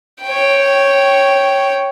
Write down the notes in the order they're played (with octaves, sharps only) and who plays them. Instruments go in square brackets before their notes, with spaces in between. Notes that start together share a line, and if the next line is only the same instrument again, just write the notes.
[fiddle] C#5 G5